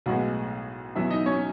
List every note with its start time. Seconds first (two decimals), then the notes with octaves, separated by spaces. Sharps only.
0.06 B1 A2 G#3 B3 F#4 F#5
0.96 E2 B2 F#3 B3 E4 E5
1.11 D#4 D#5
1.26 C#4 C#5